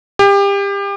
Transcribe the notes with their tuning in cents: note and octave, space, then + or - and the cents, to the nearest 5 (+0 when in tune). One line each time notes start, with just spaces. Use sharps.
G4 +30